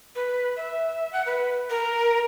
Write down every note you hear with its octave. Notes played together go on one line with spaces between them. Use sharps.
B4
E5
F#5
B4
A#4